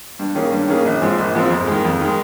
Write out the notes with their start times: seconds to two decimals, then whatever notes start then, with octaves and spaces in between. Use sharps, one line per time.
0.19 G2
0.35 D#3 A#3 C#4 G#4
0.52 G2
0.68 D#3 A#3 C#4 G#4
0.85 A#1
1.02 G#2 F3 G#3 C4
1.19 A#1
1.35 G#2 F3 G#3 C4
1.51 F2
1.67 D#3 G#3
1.85 F2
2.01 D#3 G#3